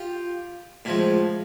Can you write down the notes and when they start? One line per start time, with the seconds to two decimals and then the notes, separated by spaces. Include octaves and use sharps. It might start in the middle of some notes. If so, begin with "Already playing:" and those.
Already playing: F4 G4
0.85 A2 F3 G#3